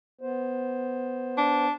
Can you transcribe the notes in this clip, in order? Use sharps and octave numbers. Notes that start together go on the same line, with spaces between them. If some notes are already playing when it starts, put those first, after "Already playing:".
B3 C5
D4